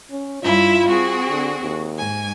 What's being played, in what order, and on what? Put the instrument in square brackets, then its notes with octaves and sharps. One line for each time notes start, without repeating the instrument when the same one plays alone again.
[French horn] C#4
[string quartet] G2 E4 E5 [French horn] F4
[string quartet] C4 F#4 G#4
[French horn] D3
D#2
[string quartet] G#2 G#5